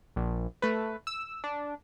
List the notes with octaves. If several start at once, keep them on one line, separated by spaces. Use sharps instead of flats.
A#1
A3 B4
E6
D4